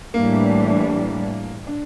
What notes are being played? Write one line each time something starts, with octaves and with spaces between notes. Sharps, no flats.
A2 E3 G3 A#3 D4
D4